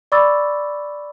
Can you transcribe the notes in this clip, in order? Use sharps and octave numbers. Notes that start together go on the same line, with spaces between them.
D5 B5 C#6 D6 E6 A6